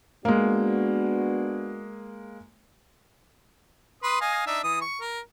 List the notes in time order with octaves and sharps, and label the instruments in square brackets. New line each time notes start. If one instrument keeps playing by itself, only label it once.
[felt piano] G#3 A#3 [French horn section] B3 D4 F#4
[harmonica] B4 C6 D#6
D#5 F5 G#5
D4 D#4 E5
E3 D#6
C#6
A#4